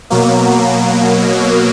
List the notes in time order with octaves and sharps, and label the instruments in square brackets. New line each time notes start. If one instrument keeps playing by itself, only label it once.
[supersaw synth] B2 F#3 A#3